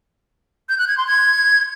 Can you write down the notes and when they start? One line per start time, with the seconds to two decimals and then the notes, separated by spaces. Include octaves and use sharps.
0.69 G6
0.78 F#6
0.88 G#6
0.97 C6
1.07 G#6